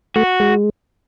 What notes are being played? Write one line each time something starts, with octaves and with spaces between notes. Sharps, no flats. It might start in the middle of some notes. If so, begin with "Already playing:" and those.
A3 F#4
G#3